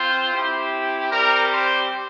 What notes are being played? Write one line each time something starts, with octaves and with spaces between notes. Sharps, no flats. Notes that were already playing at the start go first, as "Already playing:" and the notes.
Already playing: C4 F4 C5
C4 E4 G4
G3 C4 G4 A#4
C5